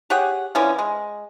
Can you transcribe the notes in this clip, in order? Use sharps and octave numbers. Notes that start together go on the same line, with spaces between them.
G4 G#4 C#5 F#5
D3 E3 F3 C#4
G#3